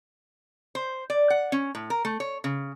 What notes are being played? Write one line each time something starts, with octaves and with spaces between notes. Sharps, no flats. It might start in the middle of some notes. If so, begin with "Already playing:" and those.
C5
D5
F#5
C#4
A2
A#4
A3
C#5
C#3